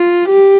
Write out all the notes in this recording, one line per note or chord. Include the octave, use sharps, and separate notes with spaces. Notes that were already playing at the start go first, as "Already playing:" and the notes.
Already playing: F4
G4